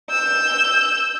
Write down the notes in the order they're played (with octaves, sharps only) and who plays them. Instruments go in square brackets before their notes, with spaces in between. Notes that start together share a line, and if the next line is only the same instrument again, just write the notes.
[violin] E6 G6